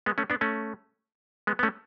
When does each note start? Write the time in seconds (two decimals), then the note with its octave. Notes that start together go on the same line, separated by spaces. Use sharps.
0.06 G#3 B3
0.18 A3 C#4
0.30 B3 D4
0.41 A3 C#4
1.47 G#3 B3
1.59 B3
1.63 A3 C#4